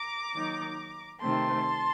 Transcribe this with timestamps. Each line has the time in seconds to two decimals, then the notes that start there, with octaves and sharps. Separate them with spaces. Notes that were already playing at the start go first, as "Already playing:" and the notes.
Already playing: A#5 D6
0.34 D#3 F#3 A#3 D#4
1.21 C3 D#3 A3 C4 A5 C6